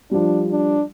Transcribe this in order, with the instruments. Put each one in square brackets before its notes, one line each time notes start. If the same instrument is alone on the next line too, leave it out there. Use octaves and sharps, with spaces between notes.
[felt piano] F3 G3 [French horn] D4
[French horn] D4